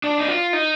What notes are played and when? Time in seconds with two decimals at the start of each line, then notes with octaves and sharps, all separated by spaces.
0.04 D4
0.18 D#4
0.28 F4
0.53 D#4